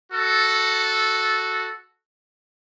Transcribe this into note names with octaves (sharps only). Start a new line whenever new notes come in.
F#4 A4